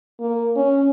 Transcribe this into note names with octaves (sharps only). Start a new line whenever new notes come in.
A#3
C#4